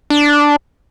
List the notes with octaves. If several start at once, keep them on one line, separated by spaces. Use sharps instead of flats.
D4